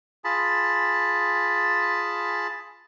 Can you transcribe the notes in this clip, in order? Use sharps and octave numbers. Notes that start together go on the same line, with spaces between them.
F4 G#4 A5 B5